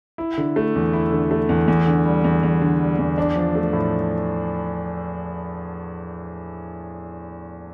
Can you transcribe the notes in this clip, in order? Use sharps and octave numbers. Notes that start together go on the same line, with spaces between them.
E4
D3
A3
E2
E4
D3
A3
E2
E2
D3
G3
E2
E2
D3
G3
E2
D4
F3
A3
A2